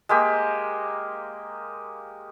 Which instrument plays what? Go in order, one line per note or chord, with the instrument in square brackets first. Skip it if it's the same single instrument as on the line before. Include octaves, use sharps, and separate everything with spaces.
[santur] G#3 A#3 G4